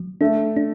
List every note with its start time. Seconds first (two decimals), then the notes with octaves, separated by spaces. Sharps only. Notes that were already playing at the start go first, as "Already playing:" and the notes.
Already playing: F#3
0.21 A3 D4
0.57 D4